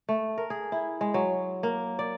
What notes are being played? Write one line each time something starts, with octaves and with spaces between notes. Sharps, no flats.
A3
A#4
G#4
E4
G#3
F#3
A#3
D5